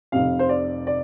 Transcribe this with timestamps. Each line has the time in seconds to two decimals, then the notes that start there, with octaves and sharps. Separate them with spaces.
0.12 F1 F2 C3 F5
0.39 C5
0.49 D5
0.87 D5